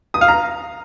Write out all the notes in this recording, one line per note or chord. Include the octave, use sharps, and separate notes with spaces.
D#6
F5
A#5